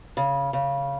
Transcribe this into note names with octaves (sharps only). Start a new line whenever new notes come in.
C#3
C#3